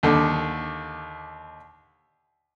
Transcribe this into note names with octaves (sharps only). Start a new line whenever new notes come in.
D#2 D3